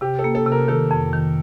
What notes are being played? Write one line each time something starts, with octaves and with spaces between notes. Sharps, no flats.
C3 G4
A4
A#3
A4
C3
A#4
D#3 A4
F2
D#3